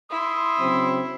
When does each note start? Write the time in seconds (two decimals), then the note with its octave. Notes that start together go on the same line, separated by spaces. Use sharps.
0.10 E4 C6 D#6
0.60 C#3 F#3 C4